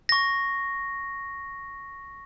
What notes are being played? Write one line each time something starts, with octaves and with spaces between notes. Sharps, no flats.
C#6 A#6